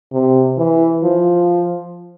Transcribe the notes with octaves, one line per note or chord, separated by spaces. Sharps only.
C3
E3
F3